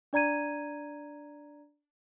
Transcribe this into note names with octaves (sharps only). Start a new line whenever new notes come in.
D4 D5 A#5 G#6 D#7